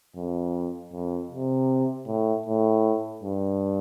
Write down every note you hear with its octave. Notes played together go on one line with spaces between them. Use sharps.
F2
F2
C3
A2
A2
G2